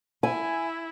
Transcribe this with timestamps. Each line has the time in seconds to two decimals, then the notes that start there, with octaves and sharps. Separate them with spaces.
0.23 E4 G#5